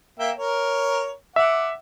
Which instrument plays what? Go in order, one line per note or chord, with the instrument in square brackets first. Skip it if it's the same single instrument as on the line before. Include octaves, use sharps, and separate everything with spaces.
[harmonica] A#3 E5 G5
A#4 C#5
[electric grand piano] E5 [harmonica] F#5 D6